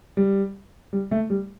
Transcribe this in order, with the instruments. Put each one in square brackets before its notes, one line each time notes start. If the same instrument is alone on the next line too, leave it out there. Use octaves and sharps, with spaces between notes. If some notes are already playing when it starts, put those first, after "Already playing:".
[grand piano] G3
G3
A3
G3